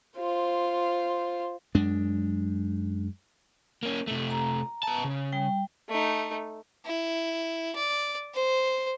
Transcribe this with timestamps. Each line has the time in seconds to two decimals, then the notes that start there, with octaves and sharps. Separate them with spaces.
0.18 F4 C5
1.75 F#2 G#3 D4
3.83 A#3 C#4
4.07 C3 A3
4.30 A#5
4.83 B3 A5
5.04 C#3
5.32 G3 G5
5.89 A3 D#4
6.85 E4
7.75 D5
8.34 C5